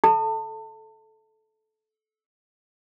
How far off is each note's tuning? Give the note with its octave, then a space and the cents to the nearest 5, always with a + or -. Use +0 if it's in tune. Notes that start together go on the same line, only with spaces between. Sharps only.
A4 -20 E5 -20 A5 +30